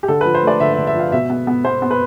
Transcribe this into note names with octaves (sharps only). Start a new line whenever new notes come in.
G4
D3 A4
B4
F3
C5
A3 D5
D3 E5
E5
D3
E5
F3 F5
B2 E5
B3
B3
B3 C5
B3
B4